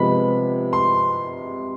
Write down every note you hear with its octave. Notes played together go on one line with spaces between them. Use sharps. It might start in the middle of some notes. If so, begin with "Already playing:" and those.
Already playing: C3 F3 G#3 B3 B5
C6